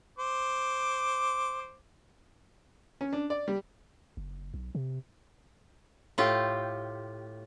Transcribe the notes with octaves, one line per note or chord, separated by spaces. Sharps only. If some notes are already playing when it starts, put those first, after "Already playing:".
C5 D6
C#4
D4
D5
G3
F#1
B1
C3
A2 F4 G4